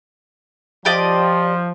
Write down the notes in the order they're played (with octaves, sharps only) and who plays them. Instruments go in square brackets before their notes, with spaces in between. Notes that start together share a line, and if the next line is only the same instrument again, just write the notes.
[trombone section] F3 [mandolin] G4 D5 D#5